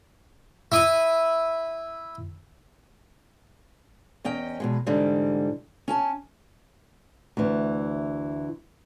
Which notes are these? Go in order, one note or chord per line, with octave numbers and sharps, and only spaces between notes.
E4 D#6
E2 C#4 D#5 G5
E2 B2 G#3
G#2 D3 E3 G3
C#4 G#5 A5
D2 E3